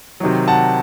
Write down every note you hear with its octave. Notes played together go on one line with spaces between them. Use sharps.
C3 D#3 F#3
F#5 A5